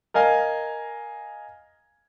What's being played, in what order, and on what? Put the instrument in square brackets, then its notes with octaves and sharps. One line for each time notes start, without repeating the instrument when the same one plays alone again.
[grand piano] A#4 D#5 F5 G#5